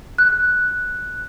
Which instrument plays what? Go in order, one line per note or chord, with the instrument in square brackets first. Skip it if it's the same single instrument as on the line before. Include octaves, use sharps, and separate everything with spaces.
[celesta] F#6